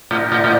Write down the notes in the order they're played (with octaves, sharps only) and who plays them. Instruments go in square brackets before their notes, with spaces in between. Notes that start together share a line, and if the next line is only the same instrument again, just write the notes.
[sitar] A2 [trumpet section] A#3 D4 G4 A#4 D#5
[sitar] A2
A2